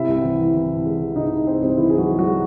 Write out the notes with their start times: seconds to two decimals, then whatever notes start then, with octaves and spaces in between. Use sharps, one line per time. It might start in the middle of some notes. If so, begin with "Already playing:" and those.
Already playing: C3 E4 E5
0.08 C2
0.23 E3
0.39 E3
0.54 C3
0.70 C3
0.85 G#3
1.01 E3
1.16 C3 D#4 D#5
1.32 C3
1.46 G#3 C4 C5
1.62 C2 C4 C5
1.77 E3 E4
1.90 E3 G#4
1.98 F#3 F#4
2.08 G#3
2.19 F#3 F#4
2.24 G#3